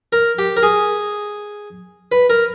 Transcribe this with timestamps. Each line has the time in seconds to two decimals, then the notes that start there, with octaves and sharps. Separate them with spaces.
0.13 A#4
0.38 G4
0.57 A#4
0.63 G#4
2.12 B4
2.30 A#4